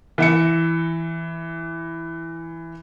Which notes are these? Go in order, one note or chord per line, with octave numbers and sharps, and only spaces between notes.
E3 E5 C#7